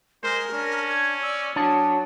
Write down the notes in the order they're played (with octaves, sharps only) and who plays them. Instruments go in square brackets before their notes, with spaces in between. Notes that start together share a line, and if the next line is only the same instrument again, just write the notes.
[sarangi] G#3 [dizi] A#4 [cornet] C5
[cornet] C#4 [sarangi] D4
[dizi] G#6
[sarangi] D5 [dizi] E6
[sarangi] F#3 [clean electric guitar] D4 A5 [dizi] D#6